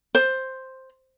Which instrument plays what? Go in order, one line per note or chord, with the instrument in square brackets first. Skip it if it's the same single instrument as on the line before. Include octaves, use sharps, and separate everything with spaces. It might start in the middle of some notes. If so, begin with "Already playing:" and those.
[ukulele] C5